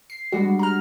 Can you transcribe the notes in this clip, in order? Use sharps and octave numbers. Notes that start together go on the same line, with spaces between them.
C7
G3 G#3 D4 F#4
G3
A#5 F6